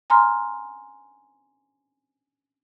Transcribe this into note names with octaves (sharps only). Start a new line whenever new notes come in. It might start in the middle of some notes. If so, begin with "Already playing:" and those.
G#5 A#5 C6 F6